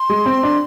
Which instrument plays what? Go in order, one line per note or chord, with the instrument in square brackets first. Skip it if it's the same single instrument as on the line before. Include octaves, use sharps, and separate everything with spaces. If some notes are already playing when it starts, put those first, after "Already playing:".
Already playing: [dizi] C6
[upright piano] G#3
C4
D4